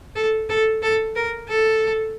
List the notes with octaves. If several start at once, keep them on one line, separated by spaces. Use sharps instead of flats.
A4
A4
A4
A#4
A4